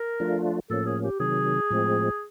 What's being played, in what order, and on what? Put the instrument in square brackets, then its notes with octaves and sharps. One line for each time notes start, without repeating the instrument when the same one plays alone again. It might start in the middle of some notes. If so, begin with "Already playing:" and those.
Already playing: [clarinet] A#4
[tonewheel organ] F3 A3 D4 F4
[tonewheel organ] A2 F3 A#3 C#4 [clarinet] A4
[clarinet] G#4
G4
[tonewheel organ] C3 D#3 F#3 [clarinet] G#4
[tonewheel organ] A2 F3 G#3 C4